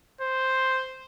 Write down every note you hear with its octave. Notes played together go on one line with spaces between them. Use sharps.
C5